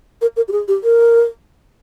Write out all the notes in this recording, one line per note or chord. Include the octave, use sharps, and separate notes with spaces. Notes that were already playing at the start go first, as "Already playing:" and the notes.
A#4
A#4
G4
G#4
G4
A#4